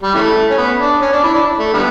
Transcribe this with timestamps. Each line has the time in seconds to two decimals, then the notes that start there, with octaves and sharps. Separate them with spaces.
0.03 G3
0.14 C#3 E3 A3
0.50 C#4
0.58 B3
0.80 D4
1.01 C#4
1.12 D4
1.24 E4
1.34 D4
1.59 A3
1.74 D3 G3 B3